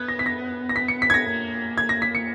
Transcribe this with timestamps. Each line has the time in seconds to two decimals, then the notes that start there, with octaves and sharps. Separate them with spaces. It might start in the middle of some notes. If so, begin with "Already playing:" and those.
Already playing: B3 F#6 G#6
0.08 A#6
0.19 B6
0.26 A#6
0.69 A#6
0.76 B6
0.88 C#7
1.02 B6
1.10 G#6
1.14 A#6
1.26 A#3
1.78 G#6
1.89 A#6
2.02 B6
2.15 C#7